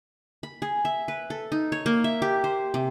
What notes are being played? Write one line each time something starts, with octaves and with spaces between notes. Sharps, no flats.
B5
G#4
E5
B4
A4
D#4
C#5
A#3
E5
G4
C5
C3